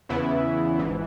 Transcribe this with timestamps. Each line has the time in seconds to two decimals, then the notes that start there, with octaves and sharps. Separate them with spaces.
0.09 E2 C#3 E3 B3 E4
0.79 G#1 G#2 E3